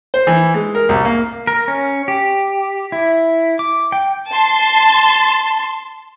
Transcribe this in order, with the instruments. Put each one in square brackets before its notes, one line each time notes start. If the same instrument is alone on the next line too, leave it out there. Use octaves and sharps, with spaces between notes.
[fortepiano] C5
E3
G#3
A#4
C2
A#3
[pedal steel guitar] A#4
C#4
G4
E4
D6
G5
[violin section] A5 C6